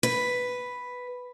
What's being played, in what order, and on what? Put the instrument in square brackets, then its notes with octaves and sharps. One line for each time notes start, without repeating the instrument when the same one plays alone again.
[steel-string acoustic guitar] B4